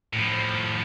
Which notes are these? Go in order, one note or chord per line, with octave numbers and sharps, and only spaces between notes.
A2 F3